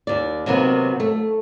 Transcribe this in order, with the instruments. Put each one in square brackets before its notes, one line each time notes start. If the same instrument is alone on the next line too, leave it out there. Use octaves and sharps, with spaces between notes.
[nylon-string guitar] D#2 D5
C3 D#3 F#3 A#3 B3
A3